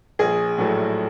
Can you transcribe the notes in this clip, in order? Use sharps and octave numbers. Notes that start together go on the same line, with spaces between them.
A#1 G#4
A2 F#3 A3